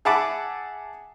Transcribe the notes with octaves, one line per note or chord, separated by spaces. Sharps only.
G#4 E5 F#5 A5 B5 D6